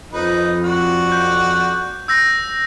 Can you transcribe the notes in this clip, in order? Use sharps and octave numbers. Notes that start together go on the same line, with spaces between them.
F2 D#4 B4
F#4 D5
G6
E6 G6 A#6